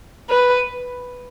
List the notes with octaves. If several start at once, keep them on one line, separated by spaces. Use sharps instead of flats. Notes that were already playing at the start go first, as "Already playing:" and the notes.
B4